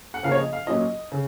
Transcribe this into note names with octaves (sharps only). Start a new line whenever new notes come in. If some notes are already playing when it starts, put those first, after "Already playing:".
F#5
C#3 F3 A#3 F4 F5
C#5
D#5
F5
A#2 F#3 C#4 F4 D#5
C#3